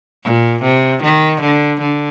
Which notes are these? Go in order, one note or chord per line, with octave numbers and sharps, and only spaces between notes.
A#2
C3
D#3
D3
D3